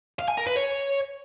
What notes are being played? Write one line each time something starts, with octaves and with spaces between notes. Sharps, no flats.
F5
G#5
A#4
B4
C#5